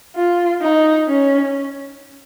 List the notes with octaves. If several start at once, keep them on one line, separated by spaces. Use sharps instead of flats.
F4
D#4
C#4